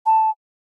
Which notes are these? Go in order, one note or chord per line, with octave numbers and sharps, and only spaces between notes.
A5